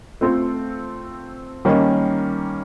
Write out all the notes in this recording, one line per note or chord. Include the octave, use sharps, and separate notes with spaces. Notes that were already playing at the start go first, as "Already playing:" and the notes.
A3 C4 F4 A4
D#3 G3 A#3 C#4